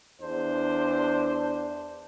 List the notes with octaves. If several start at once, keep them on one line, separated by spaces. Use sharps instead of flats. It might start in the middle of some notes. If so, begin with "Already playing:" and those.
E2 D4 C5